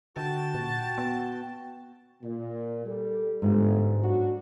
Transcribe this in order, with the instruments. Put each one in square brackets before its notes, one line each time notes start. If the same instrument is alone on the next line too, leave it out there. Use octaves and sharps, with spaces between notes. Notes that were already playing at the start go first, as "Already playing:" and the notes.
[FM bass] D3 [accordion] F#4 G5 [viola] A5
[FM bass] A#2
B3
[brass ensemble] A#2
G3 A4
[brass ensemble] G1 [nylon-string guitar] G#2
[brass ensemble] F#3 D4 F#4